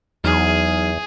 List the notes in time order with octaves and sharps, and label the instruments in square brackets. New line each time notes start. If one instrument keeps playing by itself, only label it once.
[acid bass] E2 [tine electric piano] F#3 D#4 F6 [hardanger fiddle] G#4